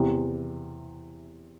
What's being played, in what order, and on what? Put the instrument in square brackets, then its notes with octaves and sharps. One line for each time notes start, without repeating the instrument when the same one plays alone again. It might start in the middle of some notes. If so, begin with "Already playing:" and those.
Already playing: [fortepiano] E2 C3 E3